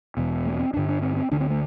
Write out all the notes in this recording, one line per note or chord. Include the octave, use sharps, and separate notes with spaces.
E1 E2 B2
A3
B3
C4
G1 G2 D3 D4
D4
C4
C4
D2 D3 D4
C4
A3